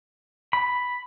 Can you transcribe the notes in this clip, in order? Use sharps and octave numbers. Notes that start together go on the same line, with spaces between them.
B5